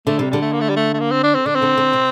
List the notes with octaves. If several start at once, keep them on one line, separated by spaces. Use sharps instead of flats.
D3 A3
C3 G3
D3 G3
A3
A#3
A3
G3
A3
A3
A#3
C4
D4
C4
D3 D4
C4
D3
D3
C3